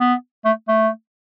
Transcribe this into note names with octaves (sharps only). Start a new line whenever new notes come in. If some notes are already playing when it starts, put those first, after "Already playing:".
B3
A3
A3